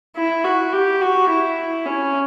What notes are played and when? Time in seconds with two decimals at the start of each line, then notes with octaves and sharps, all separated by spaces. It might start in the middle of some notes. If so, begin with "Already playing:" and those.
0.16 E4
0.44 F#4
0.73 G4
1.01 F#4
1.29 E4
1.86 C#4